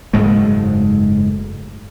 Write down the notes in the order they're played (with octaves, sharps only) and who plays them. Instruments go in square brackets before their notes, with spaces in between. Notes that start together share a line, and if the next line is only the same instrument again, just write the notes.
[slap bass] F#1 G#2 G#3 A3